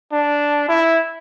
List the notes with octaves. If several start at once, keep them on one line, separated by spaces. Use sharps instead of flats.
D4
E4